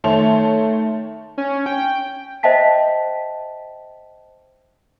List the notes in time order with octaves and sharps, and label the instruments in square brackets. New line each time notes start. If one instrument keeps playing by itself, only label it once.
[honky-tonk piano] D#3 A3 C#5 A5 C6 F7
[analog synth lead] C#4
G5
[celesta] C5 D#5 E5 G5 A5 B6